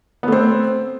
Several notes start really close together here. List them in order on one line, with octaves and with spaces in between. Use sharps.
B3 A3 C4